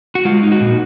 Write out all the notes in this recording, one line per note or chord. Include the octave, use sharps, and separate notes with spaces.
F#4
G#3 F4
D#4
F#4
A#2